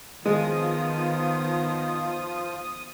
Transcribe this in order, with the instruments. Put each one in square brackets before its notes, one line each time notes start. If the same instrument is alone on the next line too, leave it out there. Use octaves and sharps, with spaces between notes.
[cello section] D#3 B3 [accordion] F3 F4 [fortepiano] G#3 [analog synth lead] D#6